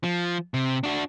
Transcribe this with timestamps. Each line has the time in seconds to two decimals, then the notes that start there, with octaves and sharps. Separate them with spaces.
0.04 F3
0.54 C3
0.84 D4 F#4